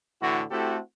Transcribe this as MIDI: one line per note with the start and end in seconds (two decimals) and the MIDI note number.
0.21 0.42 45
0.21 0.42 50
0.21 0.42 52
0.21 0.42 64
0.21 0.42 66
0.51 0.78 57
0.51 0.78 60
0.51 0.78 64
0.51 0.78 66
0.51 0.78 67
0.51 0.78 69